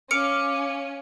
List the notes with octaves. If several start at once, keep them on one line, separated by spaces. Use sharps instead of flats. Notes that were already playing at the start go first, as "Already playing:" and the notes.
C#4 F5 D6 C#7